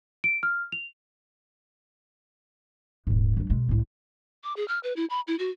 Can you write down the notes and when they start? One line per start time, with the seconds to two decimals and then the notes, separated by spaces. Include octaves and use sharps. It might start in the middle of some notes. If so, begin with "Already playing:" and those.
0.24 D7
0.43 F6
0.72 F7
3.07 D#1 G#2
3.37 F#3 D4
3.50 B2 G#3
3.69 C2 A2
4.44 D6
4.57 G#4
4.68 F6
4.83 B4
4.96 E4
5.10 B5
5.28 E4
5.39 F#4